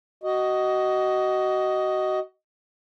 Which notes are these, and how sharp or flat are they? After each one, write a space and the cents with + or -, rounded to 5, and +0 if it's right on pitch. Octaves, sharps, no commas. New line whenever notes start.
F#4 +25 D#5 +0